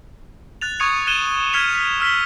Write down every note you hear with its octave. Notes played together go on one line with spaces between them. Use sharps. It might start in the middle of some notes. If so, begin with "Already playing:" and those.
F#6 A6 F7
C#6 D#6 G#6 C#7 F7
F#6 G#6 D#7 E7 G7
F6 G#6 B6 C#7 F7 G7
B6
E6 F6 B6 G7